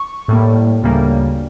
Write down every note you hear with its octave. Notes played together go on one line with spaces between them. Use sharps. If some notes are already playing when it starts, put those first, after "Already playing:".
Already playing: C#6
A2 G3 A#3
D2 C#3 G3 A#3